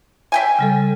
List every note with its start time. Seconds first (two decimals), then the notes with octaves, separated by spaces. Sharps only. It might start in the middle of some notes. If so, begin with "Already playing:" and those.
0.32 E5 G5 G#5
0.59 C#3 G3 A4